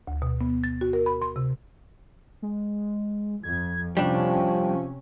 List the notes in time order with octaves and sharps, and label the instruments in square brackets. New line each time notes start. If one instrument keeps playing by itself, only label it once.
[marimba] D2
B2
B3
A6
F#4
A#4
B5
C6
C3
[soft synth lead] G#3
[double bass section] F2 [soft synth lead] G#6
[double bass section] C3 C#4 [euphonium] F3 [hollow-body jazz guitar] G3 D4 [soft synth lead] G5